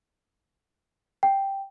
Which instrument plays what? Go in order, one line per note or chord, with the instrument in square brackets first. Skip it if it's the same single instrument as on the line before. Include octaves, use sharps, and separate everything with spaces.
[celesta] G5